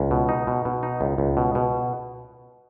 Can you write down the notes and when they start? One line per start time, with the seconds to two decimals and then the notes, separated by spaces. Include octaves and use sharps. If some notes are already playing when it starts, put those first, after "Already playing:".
Already playing: C#2
0.11 B2
0.29 D#4
0.47 B2
0.65 B2
0.83 D#4
1.01 C#2
1.18 C#2
1.37 B2
1.55 B2